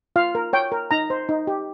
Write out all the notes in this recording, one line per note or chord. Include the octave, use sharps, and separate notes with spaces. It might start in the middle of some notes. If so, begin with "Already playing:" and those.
F4 F5
A#4
C#5 G5
A#4
D#4 A#5
C5
D#4
G4